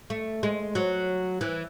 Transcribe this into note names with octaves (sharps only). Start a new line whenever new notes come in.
A3
G#3
F#3
E3